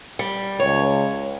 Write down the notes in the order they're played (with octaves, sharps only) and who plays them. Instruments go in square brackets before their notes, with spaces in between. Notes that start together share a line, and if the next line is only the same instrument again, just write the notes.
[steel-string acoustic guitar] G3
[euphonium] C#2 [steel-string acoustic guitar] C#5